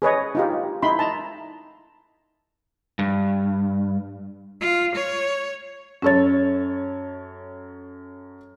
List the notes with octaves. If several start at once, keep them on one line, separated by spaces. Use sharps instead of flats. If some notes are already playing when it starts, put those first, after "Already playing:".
G#4 B4 C#5 D#5
D#4 F4 G4
D#4 E4 B5 C6
A5 A#5
G2
F4
C#5
F#2 C#4 A4 C#5 A6